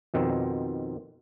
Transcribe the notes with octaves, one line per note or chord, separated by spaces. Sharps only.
F2 B2 D#3 C4